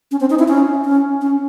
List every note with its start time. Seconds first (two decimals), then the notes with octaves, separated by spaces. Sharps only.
0.11 C#4
0.20 C4
0.30 D#4
0.39 E4
0.48 C#4
0.85 C#4
1.21 C#4